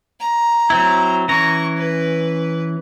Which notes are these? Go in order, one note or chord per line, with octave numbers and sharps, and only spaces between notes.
A#5
F#3 C4 E4
E3 C#4 A#5 C#6
B4